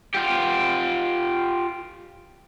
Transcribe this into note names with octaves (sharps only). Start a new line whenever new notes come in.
F4 G4